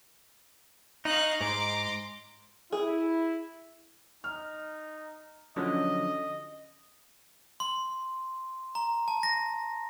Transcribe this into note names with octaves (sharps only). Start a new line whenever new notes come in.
D#4 D#5 F5 C#6 F#6
G#2 A#5 C6 D6
E4 G#4
D#4 F6
D3 F3 F#3 C#4 D#5
C6
A#5
A5
A#6